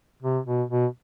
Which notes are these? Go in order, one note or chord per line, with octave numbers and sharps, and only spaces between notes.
C3
B2
B2